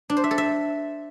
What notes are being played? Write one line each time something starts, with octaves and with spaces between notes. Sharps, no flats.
D4
C5
E5
A4
E5